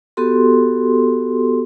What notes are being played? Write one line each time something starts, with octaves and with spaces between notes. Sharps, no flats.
B3 F#4 G4 A4 C6